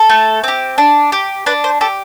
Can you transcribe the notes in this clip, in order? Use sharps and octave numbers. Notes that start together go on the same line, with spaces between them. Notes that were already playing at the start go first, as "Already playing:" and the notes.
Already playing: A4
A3
C4 G4
D4
G4
D4 B4
C5
G4 A4